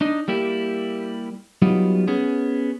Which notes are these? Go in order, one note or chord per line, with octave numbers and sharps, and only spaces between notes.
D4 D#4 D#5
G3 A#3 E4 G4
F#3 G3 B3 D#4 F4
B3 C#4 G#4